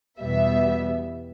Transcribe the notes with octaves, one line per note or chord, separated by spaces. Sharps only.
E2 B2 G3 B3 E5